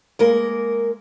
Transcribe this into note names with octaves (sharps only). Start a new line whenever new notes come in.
G#3 A#3 A#4